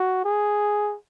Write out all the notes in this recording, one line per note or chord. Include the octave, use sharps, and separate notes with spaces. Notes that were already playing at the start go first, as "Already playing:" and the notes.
Already playing: F#4
G#4